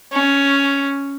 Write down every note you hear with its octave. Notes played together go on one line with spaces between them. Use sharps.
C#4